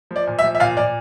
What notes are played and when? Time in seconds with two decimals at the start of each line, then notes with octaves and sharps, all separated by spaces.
0.11 F3
0.16 D5
0.27 A#2
0.39 E5
0.44 F3
0.55 E5
0.60 A#2 F5
0.77 A#2 D5